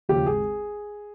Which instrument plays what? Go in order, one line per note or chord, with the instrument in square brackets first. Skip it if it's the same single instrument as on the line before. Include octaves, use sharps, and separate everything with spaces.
[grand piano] D#2 C#3 F3 G4
G#1 G#4